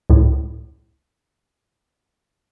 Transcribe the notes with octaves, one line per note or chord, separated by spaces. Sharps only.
C#2 A2